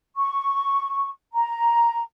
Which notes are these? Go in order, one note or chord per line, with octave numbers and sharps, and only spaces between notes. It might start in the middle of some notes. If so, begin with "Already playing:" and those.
C#6
A#5